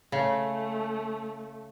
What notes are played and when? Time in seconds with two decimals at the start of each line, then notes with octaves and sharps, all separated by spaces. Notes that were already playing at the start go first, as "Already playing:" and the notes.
0.12 C#3 A3